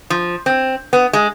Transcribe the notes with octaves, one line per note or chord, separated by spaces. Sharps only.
F3
C4
B3
G#3